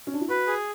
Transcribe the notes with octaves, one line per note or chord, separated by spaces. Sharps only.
C#4
D4
E4
F#4 B4
G#4